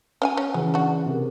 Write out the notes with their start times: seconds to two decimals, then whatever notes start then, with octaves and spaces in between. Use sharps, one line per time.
0.22 C#4 F5 G#5
0.37 C#4
0.54 C#3 E3 F#3
0.74 D4 F#4
1.06 C3 G#4 A#4